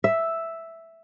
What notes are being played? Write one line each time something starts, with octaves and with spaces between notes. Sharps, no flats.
E5